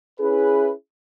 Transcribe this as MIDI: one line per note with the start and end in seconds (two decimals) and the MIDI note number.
0.20 0.70 61
0.20 0.70 64
0.20 0.70 68
0.20 0.70 71